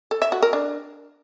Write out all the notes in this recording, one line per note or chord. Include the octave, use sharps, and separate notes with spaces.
A4
E5
F#4
A#4
D4